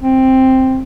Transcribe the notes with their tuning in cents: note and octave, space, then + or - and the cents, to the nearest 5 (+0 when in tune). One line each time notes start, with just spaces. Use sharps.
C4 +5